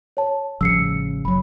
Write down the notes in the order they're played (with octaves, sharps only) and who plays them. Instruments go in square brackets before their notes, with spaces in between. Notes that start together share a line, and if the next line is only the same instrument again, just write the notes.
[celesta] C#5 A5
[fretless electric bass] A1 F3 G3 [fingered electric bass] C#3 [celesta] E6 C7 C#7
[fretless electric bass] F#1 F#3 [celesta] B5